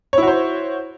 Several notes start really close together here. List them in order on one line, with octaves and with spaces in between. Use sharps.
C#5 E4 F#4 C5